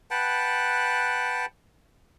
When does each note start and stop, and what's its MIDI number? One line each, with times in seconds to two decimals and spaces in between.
0.11 1.46 71
0.11 1.46 78
0.11 1.46 79
0.11 1.46 81